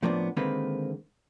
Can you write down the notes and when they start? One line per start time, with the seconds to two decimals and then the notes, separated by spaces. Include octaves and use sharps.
0.03 A2 F3 A#3 B3 D4
0.37 D3 D#3 G#3 A#3 C4 B4